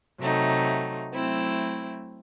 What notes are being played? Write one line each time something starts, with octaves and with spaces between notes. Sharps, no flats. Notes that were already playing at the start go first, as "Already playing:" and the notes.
C3 F#3 A3 D#4
F#3 A3 C4 E4